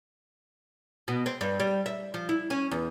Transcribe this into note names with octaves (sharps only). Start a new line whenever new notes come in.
B2
C4
G2
G3
E5
F3
E4
C#4
E2